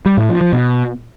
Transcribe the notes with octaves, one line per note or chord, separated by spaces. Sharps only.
G3
A2
F3
F3
B2